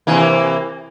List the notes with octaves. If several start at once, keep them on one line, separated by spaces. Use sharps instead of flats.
C3 E3 A#3